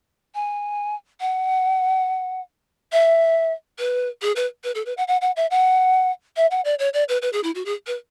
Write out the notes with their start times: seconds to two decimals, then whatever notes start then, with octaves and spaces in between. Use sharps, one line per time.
0.35 G#5
1.20 F#5
2.92 E5
3.79 B4
4.22 G#4
4.36 B4
4.64 B4
4.75 A4
4.86 B4
4.97 F#5
5.08 F#5
5.21 F#5
5.36 E5
5.51 F#5
6.36 E5
6.51 F#5
6.64 D5
6.79 C#5
6.93 D5
7.09 B4
7.22 B4
7.33 G#4
7.43 E4
7.55 F#4
7.65 G#4
7.87 B4